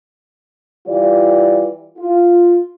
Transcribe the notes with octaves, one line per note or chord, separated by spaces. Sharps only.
E3 G3 F4 D5
F4